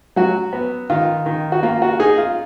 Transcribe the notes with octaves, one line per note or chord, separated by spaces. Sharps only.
F#3 F#4
B3
D#3 F4
D#3
F#4
A#3 F4
F#4
D#4 G#4
F4